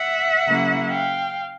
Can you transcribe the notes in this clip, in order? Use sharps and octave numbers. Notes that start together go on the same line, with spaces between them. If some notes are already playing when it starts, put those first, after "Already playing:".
Already playing: E5 F#5
C#3 F#3 A#3 C#4 E4
F5 G5